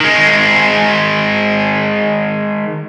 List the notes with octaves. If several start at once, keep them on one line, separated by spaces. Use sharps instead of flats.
D#3 G#3